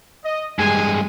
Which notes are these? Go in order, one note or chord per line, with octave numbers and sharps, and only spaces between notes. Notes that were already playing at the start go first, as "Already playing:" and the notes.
D#5
G2 G#3 G#5